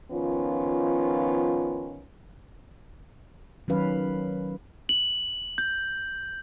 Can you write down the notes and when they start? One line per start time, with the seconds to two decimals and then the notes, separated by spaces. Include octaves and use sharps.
0.11 D#3 F3 B3 C#4 F4
3.68 D#3 F#3 C#4 B4 F5
4.89 F#7
5.58 G6